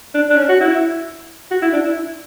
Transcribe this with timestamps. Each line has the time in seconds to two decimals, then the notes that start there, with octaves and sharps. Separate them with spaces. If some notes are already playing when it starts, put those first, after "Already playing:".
0.14 D4
0.30 D4
0.37 C#4
0.49 F#4
0.60 E4
1.51 F#4
1.62 E4
1.73 D4
1.85 E4